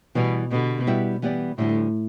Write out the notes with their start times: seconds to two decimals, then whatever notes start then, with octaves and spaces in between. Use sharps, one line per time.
0.15 B2 E3 G3 B3
0.51 B2 D3 B3 G4
0.87 G3 B3 E4 G4 E5
1.22 E3 G3 B3 G4 D5
1.58 D2 A2 D3 G3